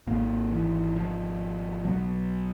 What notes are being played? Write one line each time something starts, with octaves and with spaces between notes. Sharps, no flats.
G#1 G#2 A#3
E3
F3
B1 B2 F#3